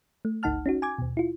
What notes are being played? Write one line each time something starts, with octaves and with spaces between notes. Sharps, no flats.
A3
G1 C#2 D#4 F#5 A5 F6
C#4 D#4 F#4
G#5 D6 G#6
D#2 B2
E4 F4